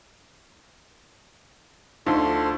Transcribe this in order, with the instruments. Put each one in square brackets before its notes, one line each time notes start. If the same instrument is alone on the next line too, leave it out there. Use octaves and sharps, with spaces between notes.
[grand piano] D2 [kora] D3 F3 [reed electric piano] D#4 [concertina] A4 C6